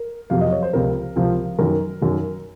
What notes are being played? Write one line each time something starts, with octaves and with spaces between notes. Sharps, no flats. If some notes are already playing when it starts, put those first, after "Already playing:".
Already playing: A#4
F2 C3 F#3 F5
D#5
C#5
C5
C#2 C3 F3 A#4
C#2 C3 F3
F#2 D#3 F#3 A#4
F#2 D#3 F#3